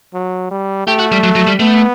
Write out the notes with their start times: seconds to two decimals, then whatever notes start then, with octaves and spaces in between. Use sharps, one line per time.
0.14 F#3
0.51 G3
0.87 A3 G4
0.99 F#4
1.12 G3
1.23 F#3
1.36 F#3
1.47 G3
1.59 A3 B3